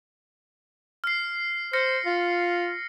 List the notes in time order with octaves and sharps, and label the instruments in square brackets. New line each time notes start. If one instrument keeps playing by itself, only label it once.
[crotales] F6 C7
[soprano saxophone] C5 [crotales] F6 A#6 C#7
[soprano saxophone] F4